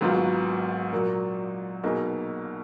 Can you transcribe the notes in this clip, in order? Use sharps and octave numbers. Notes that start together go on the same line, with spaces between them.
G#1 G#2 F#3 B3 F4
A#2 F#3 A#3
B1 B2 A#3 D#4 G#4